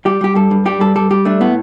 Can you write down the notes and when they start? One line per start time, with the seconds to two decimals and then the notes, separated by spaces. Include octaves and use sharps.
0.05 G3 G4
0.21 G3 G4
0.35 G2 A4
0.51 G2
0.66 G3 G4
0.80 G2 A4
0.96 G3 A4
1.11 G3 G4
1.25 A3 D4
1.41 A2 B3